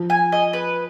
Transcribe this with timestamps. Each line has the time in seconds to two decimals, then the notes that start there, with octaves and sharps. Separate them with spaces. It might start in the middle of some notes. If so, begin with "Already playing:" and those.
Already playing: F3
0.10 G#5
0.32 D#5
0.53 B4